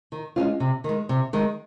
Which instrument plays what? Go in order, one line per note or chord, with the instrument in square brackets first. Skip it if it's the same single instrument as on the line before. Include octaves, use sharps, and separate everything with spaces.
[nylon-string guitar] D#3
G#3 C#4 F4
C3
D#3 G#3
C3
D#3 G#3